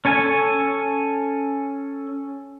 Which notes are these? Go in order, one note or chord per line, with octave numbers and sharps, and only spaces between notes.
C#4 A4 G#5